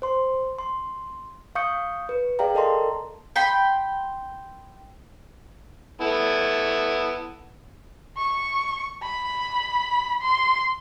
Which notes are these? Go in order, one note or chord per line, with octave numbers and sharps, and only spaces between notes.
C5 C6
C6
F5 C#6 D#6 G6 C#7
B4
G#4 D5 F5 G5 A#5
A4 A#4 D#5 A5 A#5 C6
G5 B5 C6
B3 E4 A4
C#6
B5
C6